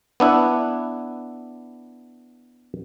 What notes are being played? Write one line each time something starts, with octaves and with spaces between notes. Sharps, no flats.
B3 D4 E4 F#5